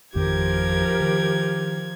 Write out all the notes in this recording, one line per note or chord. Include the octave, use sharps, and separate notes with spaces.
G#1 F2 D#3 F3 G4 A#4 G#6
D#3